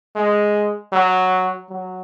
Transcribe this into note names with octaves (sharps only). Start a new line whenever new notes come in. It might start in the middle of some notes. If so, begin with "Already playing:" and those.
G#3
F#3
F#3